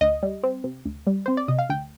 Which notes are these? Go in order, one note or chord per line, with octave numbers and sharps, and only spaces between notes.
D2 D#5
G3
C4
C3
D2
G3
C4 C5
D5
C3 D#5
F5
D2 G5